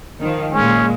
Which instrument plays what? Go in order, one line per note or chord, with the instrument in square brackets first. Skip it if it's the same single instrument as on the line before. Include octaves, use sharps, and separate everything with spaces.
[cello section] D#3 F3
[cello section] A#2 G#3 [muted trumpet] C#4